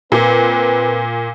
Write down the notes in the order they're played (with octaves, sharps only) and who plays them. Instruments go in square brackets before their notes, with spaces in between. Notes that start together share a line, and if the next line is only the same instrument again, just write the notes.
[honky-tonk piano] A#2 [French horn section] C4 F4 B4